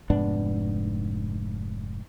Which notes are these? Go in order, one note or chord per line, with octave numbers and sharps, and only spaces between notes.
F1 G#2 B3 D4